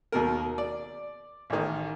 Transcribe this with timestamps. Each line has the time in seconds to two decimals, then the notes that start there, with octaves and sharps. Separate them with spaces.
0.12 D#2 B2 A#4
0.58 D5
1.50 A1 D#3